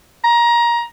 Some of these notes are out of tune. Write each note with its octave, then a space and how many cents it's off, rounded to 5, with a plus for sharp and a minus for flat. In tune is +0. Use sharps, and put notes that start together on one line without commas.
A#5 +20